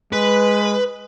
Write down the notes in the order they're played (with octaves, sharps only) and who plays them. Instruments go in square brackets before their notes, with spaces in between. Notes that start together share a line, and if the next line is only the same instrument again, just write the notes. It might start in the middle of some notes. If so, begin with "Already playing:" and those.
[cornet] G#3 [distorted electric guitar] B4